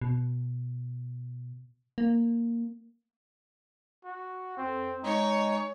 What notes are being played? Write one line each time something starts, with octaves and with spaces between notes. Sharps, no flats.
B2
A#3
F#4
F2 C4
G#3 D#4 C#5